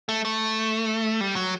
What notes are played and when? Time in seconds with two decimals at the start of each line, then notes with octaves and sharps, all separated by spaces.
0.09 A3
0.25 A3
1.21 G3
1.36 F#3